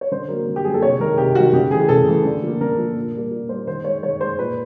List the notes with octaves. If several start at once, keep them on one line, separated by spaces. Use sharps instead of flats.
C#5
D3 C5
F#3 A#3 A#4
D3
G4
F#3 A#3 G#4
A4
C3 C#5
D#3 G#3 A#4
C3 G4
D#3 G#3 F#4
C#3 G4
E3 A3 G#4
C#3 A4
E3 A3
D3
F3 A#3
D3 A#4
F3 A#3
A#2
G3 A#3
A#2
G3 A#3 C5
D#3 C5
G#3 C#5
D#3 C#5
G#3 C5
A#2 B4